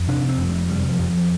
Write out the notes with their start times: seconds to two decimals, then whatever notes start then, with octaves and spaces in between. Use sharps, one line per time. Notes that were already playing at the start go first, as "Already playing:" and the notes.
Already playing: F2
0.08 C3 D4
0.28 C4
0.38 F2
0.49 A3
0.69 C3 G3
0.89 F3
0.99 F2
1.09 F3